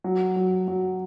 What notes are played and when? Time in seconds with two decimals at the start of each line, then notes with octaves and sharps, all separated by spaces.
0.04 F#3
0.36 F#3
0.68 F#3